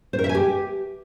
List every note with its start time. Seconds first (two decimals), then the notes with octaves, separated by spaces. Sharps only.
0.13 C5
0.19 A#4
0.24 E5
0.29 G#5
0.35 G4